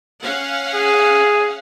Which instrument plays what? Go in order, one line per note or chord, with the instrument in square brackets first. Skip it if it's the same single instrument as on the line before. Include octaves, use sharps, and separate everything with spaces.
[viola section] C#4 F5 F#5
[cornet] G#4